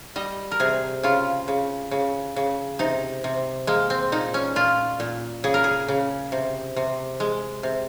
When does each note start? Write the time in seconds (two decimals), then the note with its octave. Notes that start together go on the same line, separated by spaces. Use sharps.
0.16 G3 D#5
0.51 A#4
0.60 C3 G#4
1.03 C#3 F4
1.48 C#3
1.91 C#3
2.36 C#3
2.79 C3 D#4
3.24 C3
3.67 G#3 A#3
3.90 C4
4.12 A#2 D#4
4.34 C#4
4.56 A#2 F4
5.00 A#2
5.44 C#3 G#4
5.54 A#4
5.64 G#4
5.88 C#3
6.32 C3
6.76 C3
7.20 G#3
7.63 C3